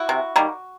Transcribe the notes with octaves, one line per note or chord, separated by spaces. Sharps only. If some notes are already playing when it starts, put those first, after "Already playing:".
Already playing: E4 F#4
C3
D#3 G3 A#3